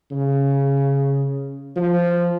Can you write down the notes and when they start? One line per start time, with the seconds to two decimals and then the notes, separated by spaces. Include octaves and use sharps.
0.11 C#3
1.76 F3